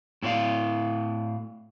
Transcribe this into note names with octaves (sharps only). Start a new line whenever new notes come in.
A2 E4 F4 C5 D5 F5